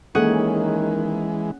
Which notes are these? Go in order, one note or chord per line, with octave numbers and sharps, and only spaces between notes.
D#3 E3 G#3 A#3 C#4 G#4 A4 F#5